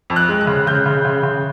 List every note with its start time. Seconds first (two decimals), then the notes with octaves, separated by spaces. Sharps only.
0.10 F2
0.16 F#6
0.28 G#3
0.41 F#6
0.47 C#3
0.67 C#3 G6
0.86 C#3
1.05 C#3
1.23 C#3